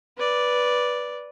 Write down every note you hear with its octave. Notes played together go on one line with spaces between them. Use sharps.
B4 D5